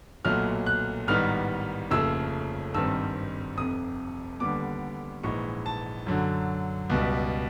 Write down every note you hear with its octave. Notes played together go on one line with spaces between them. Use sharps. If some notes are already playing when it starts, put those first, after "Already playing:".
B1 A#2 F#3 A3 F6
F#6
A1 G#2 D#3 G3 B3 F6
F1 D#2 C#3 F3 A3 E6
G#1 G2 D#3 G3 C4 E6
F1 F2 C3 D#6
D#2 D3 G3 B3 D6
A#1 G#2 E3 G#3 C#6
A5
F#2 D3 F#3
C#2 B2 G3